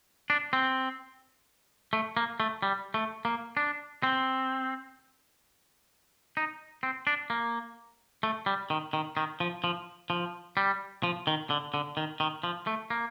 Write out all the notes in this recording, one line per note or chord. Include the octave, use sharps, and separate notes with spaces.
D4
C4
A3
A#3
A3
G3
A3
A#3
D4
C4
D#4
C4
D4
A#3
A3
G3
D#3
D#3
D#3
F3
F3
F3
G3
F3
D#3
D3
D3
D#3
D#3
F3
A3
A#3